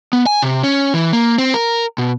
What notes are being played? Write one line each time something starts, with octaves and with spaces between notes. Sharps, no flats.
B3
G#5
C3
C#4
E3
A#3
C4
A#4
B2